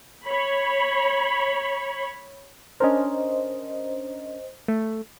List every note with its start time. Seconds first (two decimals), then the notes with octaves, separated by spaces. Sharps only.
0.25 C#5 B5
2.80 C#4 D4 A#4 C5 D#5
4.68 A3